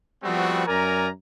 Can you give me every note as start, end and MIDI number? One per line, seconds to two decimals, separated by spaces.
0.24 0.64 53
0.24 0.64 55
0.24 0.64 57
0.24 0.64 59
0.24 0.64 60
0.24 0.64 66
0.67 1.08 42
0.67 1.08 70
0.67 1.08 74
0.67 1.08 80
0.67 1.08 82